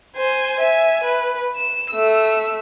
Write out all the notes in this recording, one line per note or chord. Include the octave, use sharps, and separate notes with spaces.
C5 G#5
E5 G#5
B4
E7
A3 E6